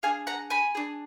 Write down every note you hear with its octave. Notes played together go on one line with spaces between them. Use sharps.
D4 G#4 F5 G#5
F#5 A#5
G#5 B5
D4 G#4